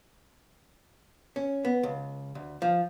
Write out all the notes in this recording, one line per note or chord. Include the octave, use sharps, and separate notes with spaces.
C#4
B3
C#2
D2
F3